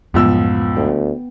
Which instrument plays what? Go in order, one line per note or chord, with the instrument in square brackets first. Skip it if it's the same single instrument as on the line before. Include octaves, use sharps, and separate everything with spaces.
[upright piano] C#2 F3 E6 [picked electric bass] F#2 A2 [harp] B3
[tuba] D2 [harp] G5